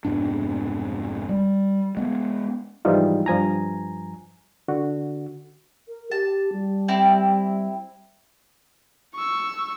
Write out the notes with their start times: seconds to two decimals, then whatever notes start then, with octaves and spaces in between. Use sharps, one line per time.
0.05 F1 G#2 B2 D4
1.29 G3
1.97 G#3 B3
2.85 G#2 E3 F3 G3 D#4 F4
3.26 G2 F3 G#5 A#5
4.68 D3 F#4
5.88 A#4
6.11 G4 A5
6.53 G3
6.88 C4 E4 G4
9.15 C#6 E6